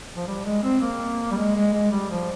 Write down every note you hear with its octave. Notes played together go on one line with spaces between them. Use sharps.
F3
G3
G#3
C4
A#3
G3
G#3
G#3
G#3
G3
F3